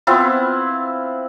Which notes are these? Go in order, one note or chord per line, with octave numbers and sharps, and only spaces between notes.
B3 C4 E4 F4